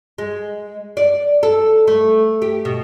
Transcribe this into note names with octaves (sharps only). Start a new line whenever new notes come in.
G#3
D5
A4
A3
G4
B2